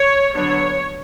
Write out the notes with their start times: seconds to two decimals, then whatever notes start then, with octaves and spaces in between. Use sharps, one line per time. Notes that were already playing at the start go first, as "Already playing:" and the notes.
Already playing: C#5
0.35 D3 F#3 B3 D4 C#5